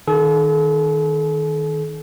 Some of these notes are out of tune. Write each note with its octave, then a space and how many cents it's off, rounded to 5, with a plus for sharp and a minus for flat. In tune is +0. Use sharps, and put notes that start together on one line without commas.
D#3 +0 A4 -45 G#5 +45